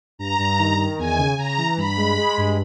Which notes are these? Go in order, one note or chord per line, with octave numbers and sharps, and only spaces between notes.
G2 A#5
G2
D#3
D#3
E2 G#5
C#3
C#3 A#5
E3
G2 B5
G#3
G#3
G2